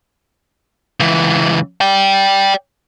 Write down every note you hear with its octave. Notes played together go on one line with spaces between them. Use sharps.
C#2 E3
D5 G5